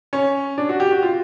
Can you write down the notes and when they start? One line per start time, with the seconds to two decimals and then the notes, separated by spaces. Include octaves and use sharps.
0.13 C#4
0.58 D4
0.69 F#4
0.80 G4
0.91 F#4
1.03 F4